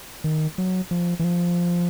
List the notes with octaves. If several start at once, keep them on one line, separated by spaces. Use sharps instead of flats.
D#3
F#3
F3
E3
F3